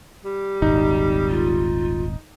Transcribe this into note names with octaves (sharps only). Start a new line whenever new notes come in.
G3
D#1 G#1 D#4
F4